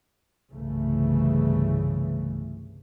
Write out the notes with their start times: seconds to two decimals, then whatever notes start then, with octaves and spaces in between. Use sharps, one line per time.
0.51 G1 C2 C#3 E3 A3